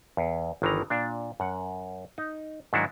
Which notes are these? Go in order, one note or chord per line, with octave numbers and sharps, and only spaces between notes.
E2
G1 D#3 E3 A#5
A#2 D4
F#2 F#5
D#4
G#2 D#3 F#3 D4 E4 F#4